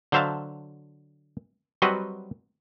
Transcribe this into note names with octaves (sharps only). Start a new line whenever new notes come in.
D3 F#3 C5 E5 F5 A5
F#3 G3 C4 F#4 B4 D#5